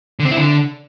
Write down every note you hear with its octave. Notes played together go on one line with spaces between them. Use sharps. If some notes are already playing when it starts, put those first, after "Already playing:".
D3
C4
E4
D3